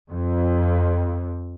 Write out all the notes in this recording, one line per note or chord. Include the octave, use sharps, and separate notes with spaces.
F2